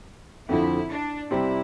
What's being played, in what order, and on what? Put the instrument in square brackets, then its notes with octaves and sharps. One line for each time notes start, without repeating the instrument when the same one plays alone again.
[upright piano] F2 D3 F3 [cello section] E4
[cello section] D4
[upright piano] C3 G3 C4 [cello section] E4